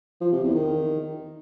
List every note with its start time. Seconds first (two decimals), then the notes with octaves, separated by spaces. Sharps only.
0.21 F3
0.32 C3
0.43 E2
0.55 D#3